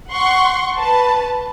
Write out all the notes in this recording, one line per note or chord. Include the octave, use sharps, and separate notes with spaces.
F#5 C6 C#6
B4 A5